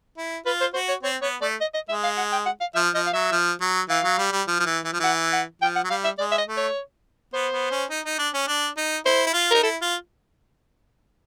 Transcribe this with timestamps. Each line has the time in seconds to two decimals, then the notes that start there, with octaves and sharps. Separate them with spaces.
0.17 E4
0.46 F4 B4
0.61 C5
0.74 F#4 C5
0.88 C#5
1.03 C4 C#5
1.22 B3 C#5
1.41 A3 D5
1.61 D#5
1.74 D#5
1.89 G#3 E5
2.04 F5
2.17 F#5
2.32 G5
2.46 F#5
2.61 F5
2.75 F3 E5
2.94 F3 D#5
3.06 F5
3.13 F#3 E5
3.32 F3
3.61 F#3
3.89 E3 F5
4.04 F#3
4.18 G3
4.32 G3
4.47 F3
4.60 F3
4.66 E3
4.84 E3
4.93 F3
5.00 E3 F#5
5.33 F#5
5.62 F3 G5
5.76 F#5
5.84 F#3
5.90 G3 F5
6.04 E5
6.19 G#3 D5
6.32 E5
6.38 D#5
6.47 A3
6.57 C#5
7.33 B3 C5
7.53 B3
7.71 C#4
7.90 D#4
8.06 D#4
8.19 D4
8.34 C#4
8.48 D4
8.77 D#4
9.06 E4 C5
9.26 E4
9.33 F4
9.51 D#4 A#4
9.63 E4 A4
9.82 F4